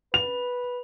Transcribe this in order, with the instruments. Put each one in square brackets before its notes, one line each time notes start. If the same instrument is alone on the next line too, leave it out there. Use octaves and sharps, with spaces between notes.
[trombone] B4 [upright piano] F7